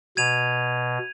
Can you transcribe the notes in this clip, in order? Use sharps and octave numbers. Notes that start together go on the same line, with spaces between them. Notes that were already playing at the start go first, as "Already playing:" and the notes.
B2 G#6 D#7 F7